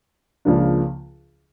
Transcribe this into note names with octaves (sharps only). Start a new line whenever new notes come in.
C#2 C#3 F3 A#3 D4